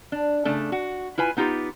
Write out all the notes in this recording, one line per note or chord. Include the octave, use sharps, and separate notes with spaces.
D4
C#3 A3 D4
F#4
E4 F4 B4 G#5
B3 D#4 F4 G4